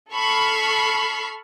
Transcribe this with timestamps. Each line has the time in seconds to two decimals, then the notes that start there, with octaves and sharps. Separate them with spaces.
0.13 A4 B5 C#6 F6 C7